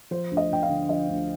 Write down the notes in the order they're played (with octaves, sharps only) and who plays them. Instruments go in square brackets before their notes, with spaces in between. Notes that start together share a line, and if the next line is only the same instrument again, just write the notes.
[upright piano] F3 C5
D2
D#5
D2 G5
F5
D3
F3 D#5
D2